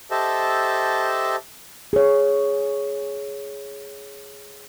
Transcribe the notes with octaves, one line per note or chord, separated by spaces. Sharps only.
G4 A4 C5 D#5 E5 A5
G#4 C#5